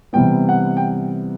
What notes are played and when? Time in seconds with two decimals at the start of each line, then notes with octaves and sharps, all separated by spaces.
0.13 C3 E3 G3 B3 G5
0.49 F#5
0.77 G5
0.83 F#5